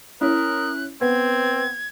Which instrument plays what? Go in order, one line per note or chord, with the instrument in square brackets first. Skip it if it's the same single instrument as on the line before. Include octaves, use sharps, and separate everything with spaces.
[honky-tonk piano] C#4 E4 [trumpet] A#4 [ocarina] D#6 [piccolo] F#6
[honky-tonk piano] B3 [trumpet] C4 [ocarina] B4 [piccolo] G#6